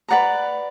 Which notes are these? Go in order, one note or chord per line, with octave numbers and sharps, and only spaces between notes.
B4 D5 F#5 A#5